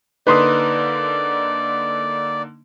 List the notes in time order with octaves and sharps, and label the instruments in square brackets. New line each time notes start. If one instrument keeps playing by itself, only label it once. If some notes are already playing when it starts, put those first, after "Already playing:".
[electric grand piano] D3 A#3 D#4 [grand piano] B4 C6 D#6 [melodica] D5